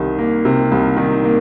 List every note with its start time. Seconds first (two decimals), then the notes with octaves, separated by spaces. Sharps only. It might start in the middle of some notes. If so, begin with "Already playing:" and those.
Already playing: C2 D#3
0.19 A#3
0.45 C3
0.72 C2
0.97 D#3
1.24 A#3